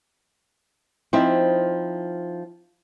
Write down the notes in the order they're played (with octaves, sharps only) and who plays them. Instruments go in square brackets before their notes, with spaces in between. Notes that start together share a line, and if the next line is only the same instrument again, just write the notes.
[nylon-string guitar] F3 C4 D#4 E4